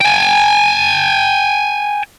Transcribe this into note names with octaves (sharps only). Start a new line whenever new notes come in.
G5 G#5